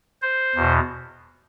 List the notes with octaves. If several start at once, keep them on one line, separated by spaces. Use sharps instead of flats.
C5
E2 B2